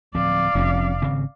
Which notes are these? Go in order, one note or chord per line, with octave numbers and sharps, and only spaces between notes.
D1 F3 C4 D5 F5
F1 F3 C4 C#4
G#1 C#3 C4